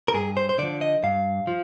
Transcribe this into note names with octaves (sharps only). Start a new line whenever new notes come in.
A#4
G2 G#4
C5
C5
D3 F3 D5
D#5
G2 F5
F3